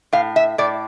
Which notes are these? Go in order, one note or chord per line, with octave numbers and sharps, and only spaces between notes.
A2 F5
E5
A2 D5